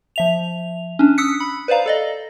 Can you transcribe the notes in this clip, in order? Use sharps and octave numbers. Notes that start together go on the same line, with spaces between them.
F3 E5 F7
C#4 D4
D#6 E6 F#6 B6 C#7
B5
B4 C5 D5 F5 A#5
A4 D5 D#5